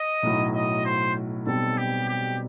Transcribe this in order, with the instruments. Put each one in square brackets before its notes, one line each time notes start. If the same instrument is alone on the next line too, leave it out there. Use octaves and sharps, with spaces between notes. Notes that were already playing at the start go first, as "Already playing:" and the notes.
Already playing: [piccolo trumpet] D#5
[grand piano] B1 A2 F#3
[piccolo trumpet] D#5
C5
[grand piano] B1 B2 G3 C4 [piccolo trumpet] A4
[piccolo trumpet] G4
G4